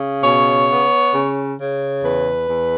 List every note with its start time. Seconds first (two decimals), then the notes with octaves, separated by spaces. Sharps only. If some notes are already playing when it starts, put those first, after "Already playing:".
Already playing: C#3
0.24 B2 C#5
0.70 B3
1.15 C#3
1.59 C#3
2.04 E2 B4
2.49 E2